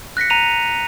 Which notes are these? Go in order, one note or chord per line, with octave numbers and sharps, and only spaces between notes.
F#6 A#6 B6 C#7
A#5 D#7 F7